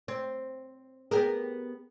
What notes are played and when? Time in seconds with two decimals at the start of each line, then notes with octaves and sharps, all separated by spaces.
0.08 C4
1.11 B3 G4 G#4 A#4